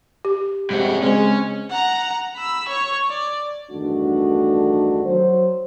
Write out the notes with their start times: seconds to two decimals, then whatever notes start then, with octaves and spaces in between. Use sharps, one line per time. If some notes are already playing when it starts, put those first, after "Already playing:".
0.25 G4
0.70 G2 C3 G3 G#3 F#4
1.02 C#3 G#3 C4 C#4 C5
1.70 F#5 A#5
2.36 B5 E6
2.68 C#5 C#6
3.09 D5
3.71 E2 G2 D#3 A3 D4 F#4
5.05 F#3 C5